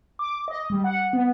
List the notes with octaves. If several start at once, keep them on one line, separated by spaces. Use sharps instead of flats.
D6
D#5
G3
F#5
B3